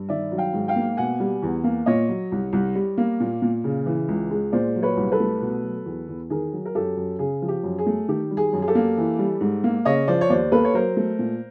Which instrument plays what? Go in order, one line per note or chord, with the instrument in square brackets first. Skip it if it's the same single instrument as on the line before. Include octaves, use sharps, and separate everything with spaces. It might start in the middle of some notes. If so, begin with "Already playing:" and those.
Already playing: [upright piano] G2
D#3 D5 E5
F#3
F5 G5
G#2
F5 G5
A#3
B2 F#5 G#5
G3
E2
A#3
A#2 C#5 D#5
F#3
C2
C2
G3
A#3
A#2
A#2
C#3
E3
C#2
G#3
A#2 C5 D5
F#3
B4 C#5
C2
A4 B4
A3
B2
F#3
E2
E2
D#3 G#4 A#4
F#3
A#4
F#2 G4 A4
F#2
C#3 G#4
F3
G4
F#2
G#4
A3
D#3 G4
G3
G#4
F#2
G#4
G4 A4
A#3
E3
G3
G#2
A#3
C#3 C#5 D#5
F3 C5 D5
C#5
D#2 C5 D5
A#3 A4 B4
C#5
F#3 A#4 C5
A3
A#2